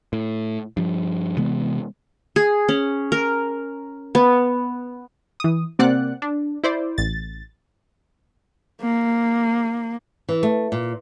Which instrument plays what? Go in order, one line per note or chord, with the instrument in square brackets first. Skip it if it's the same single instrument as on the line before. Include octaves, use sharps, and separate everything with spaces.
[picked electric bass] A2
G2 F3
C3 E3 G#3 B3
[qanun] G#4
C#4
A#4
B3
[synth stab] E3 D#6
C3 A#3 C4 D5 F#5 F#6
D4
E4 C5 D5
A1 A6
[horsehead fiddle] A#3
[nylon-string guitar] E3
A3
A#2